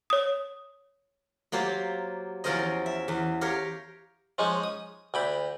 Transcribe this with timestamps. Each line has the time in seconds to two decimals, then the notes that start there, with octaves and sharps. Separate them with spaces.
0.10 C#5 D#6
1.52 F#3 A#3 F4 G4 C5
2.44 E2 F3 C#4 A#4 C5 D#5
2.86 E5
3.08 E2
3.41 G4 A#4 C#5 F5 C6
4.38 F3 G#3 C#4 D#4
4.64 D#6
5.14 D2 G5 B5